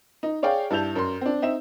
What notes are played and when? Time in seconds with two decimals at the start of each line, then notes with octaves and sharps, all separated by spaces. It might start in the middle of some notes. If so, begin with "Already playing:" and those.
0.23 D#4
0.42 G#4 C#5 D5 F5 G5
0.70 G2 E4 A5 G6 F7
0.96 F#2 C6
1.21 C4 D4
1.42 C4 D#4 E5 E7